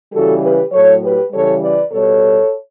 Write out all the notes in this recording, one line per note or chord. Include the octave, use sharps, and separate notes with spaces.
C#3 E3 G3 F#4 A4
G4 B4
A2 F#3 A4 C#5
G4 B4
C#3 E3 G3 A4 C#5
B4 D5
B2 G3 A4 C#5